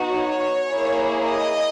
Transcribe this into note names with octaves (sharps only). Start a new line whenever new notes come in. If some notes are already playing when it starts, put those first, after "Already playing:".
Already playing: B3 D#4 F#4
C#5
A#3 E4 G#4
D#5